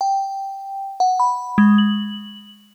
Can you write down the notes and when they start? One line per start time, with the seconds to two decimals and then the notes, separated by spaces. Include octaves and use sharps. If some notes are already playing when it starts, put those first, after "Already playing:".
0.01 G5
1.00 F#5
1.20 B5
1.58 G#3
1.78 F#7